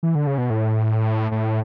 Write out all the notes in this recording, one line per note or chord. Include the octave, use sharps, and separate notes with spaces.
E3
D3
C#3
B2
A2
A2